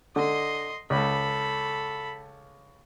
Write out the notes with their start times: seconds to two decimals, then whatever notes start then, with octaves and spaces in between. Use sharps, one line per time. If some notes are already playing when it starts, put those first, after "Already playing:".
0.16 D3 D#5 C6
0.90 C#2 A4 B5